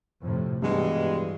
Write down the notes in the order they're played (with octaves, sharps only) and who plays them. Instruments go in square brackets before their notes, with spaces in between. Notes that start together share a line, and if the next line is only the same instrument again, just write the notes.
[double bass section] F2 A2 C3
[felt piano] G2 [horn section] B2 G3 G#3 [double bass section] E3